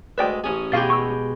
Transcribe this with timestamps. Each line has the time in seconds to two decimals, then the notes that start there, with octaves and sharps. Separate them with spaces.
0.18 D2 G#3 B4 D5 E5 G5
0.44 A1 C#4 G#4
0.72 B2 G#3 F4 G4 F5 A6
0.90 C#6 E6